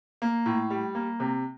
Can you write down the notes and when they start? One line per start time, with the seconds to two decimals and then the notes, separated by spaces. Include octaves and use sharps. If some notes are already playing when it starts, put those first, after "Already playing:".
0.22 A#3
0.46 A2
0.70 G3
0.95 A#3
1.20 C3